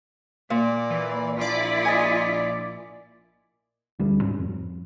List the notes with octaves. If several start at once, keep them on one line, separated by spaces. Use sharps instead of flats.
A#2 A#3 D5
E3
A#1 E4 F4 D5
D#5 G#5
D2 G3
G#2 G3 C#4
F2